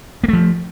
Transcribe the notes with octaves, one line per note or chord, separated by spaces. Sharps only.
F3 A3 A#3